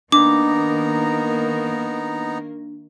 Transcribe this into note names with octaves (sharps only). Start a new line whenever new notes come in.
D#3 A#3 B3 D4 D#4 A#4 A#5 D6